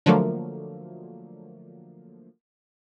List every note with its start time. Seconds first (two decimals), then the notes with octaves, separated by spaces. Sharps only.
0.06 D3 F3 F#3 A3 A#3